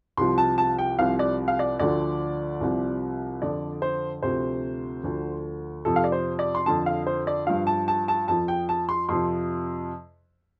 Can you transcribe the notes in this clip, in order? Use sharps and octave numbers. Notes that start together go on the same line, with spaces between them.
C2 C3 F3 C6
A5
A5
G5
C2 C3 F3 F5
D5
F5
D5
D2 D3 F3 D5
C2 C3 F3
F2 D3 F3 D5
C5
D2 C3 F3 C5
D2 D3 F3
F2 C3 F3 A4
F5
D5
C5
D5
C6
F2 D3 F3 A5
F5
C5
D5
G2 F3 F5
A5
A5
A5
F2 F3 A5
G5
A5
C6
F2 C3 F3 C6